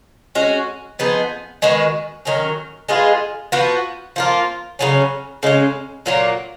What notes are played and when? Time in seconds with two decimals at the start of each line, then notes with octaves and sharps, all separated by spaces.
0.35 G#3 C#4 F#4
0.99 F3 B3 D#4 G#4
1.62 D#3 G#3 B3 F#4
2.25 D#3 F#3 C#4
2.89 G#3 B3 F4 G#4
3.52 F3 B3 F#4
4.16 F3 A#3 F4
4.79 C#3 F#3 C#4
5.43 C#3 G#3 C#4
6.06 A#2 F#3 A#3